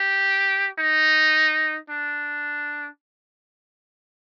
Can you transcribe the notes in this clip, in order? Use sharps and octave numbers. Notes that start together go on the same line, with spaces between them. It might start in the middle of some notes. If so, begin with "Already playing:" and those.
Already playing: G4
D#4
D4